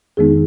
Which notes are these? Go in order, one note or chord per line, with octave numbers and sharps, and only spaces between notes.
F2 D#3 G#3 B3 D#4 G#4